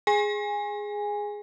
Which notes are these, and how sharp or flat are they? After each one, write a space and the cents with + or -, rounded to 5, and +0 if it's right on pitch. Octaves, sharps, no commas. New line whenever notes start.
G#4 +0 G#5 -15